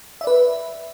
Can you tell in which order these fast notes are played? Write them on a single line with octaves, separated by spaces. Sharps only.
E5 D5 B4